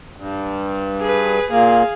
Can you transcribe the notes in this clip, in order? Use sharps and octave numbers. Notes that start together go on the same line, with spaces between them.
G2
G#4 B4
A#2 A#3 G#4 F5